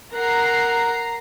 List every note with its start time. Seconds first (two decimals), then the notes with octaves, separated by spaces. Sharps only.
0.14 A#4 F#5 A#5 C7